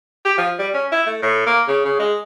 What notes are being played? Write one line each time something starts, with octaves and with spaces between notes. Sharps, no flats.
G4
F3
G3
C#4
E4
A3
A2
A#3
C#3
C#3
G#3